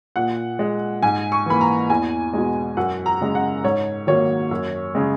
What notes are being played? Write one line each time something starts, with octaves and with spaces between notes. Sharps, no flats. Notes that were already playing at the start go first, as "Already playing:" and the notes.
A#2 F#5
G#3
G#2 G#5
C#6
E3 A#3 B5
A#5
E2 G#5
B2 G#3
F#2 F#5
A#5
C#3 G#3
F#5
G#2 C#5
D#3 F#3 A#3 C#5
F#2
C#3 G#3